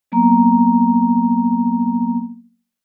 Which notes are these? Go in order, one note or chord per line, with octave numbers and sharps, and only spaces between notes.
F#3 A#3 B3 A#5